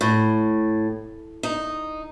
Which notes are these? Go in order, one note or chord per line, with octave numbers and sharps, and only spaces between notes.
A2
D#4